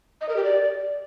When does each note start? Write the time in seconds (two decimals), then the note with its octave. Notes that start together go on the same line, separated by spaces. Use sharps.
0.21 D#5
0.29 A#4
0.36 G4
0.44 D5